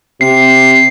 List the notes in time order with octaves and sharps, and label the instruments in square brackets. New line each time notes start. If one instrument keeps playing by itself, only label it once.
[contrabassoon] C3 [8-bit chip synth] C7